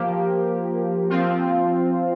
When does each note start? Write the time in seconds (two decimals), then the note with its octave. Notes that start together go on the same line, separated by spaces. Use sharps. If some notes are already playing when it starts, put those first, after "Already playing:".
Already playing: F3 A#3 G4
1.10 F3 C4 F4